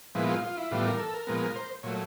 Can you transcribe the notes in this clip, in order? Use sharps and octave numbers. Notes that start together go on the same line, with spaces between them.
A#2 F3 G#3 B3 E4
F4
F4
E4
A2 E3 G3 B3 F4
A#4
A4
A#4
A#2 F3 G#3 B3
C5
A#2 F#3 A3 C#5